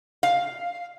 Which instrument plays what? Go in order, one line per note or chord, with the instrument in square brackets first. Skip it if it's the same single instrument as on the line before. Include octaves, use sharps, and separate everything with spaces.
[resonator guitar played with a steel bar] F5